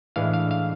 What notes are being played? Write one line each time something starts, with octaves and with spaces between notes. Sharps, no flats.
A2 E3 G#3 D4 F5
F5
F5